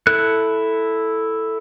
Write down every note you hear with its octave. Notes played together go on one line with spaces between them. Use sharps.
E4 A4 F#6